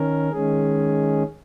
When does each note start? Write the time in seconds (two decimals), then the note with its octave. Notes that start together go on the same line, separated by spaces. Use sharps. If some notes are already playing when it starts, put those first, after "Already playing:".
Already playing: D#3 C#4 A#4
0.31 D#3 G#3 C#4 G#4